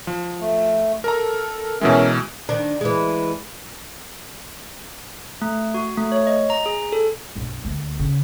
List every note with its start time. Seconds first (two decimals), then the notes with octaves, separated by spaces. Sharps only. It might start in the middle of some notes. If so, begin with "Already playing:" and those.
0.07 F3
0.41 A3
1.04 A4 A#4 A#5
1.81 B2 E3 G#3 C#4 A#4 E5
2.49 D#3 D4
2.81 E3 G#3
5.42 A3
5.74 F#4
5.98 A3
6.12 C#5
6.27 D#5
6.50 A#5
6.66 G#4
6.92 A4
7.35 B1 G2
7.65 D2 A#3
7.99 C#3 C#4